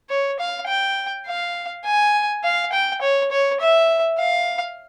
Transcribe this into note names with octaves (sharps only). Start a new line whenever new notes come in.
C#5
F5
G5
F5
G#5
F5
G5
C#5
C#5
E5
F5